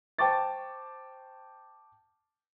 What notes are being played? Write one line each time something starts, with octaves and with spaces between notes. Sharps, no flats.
C5 G5 A5 C#6 D6 A6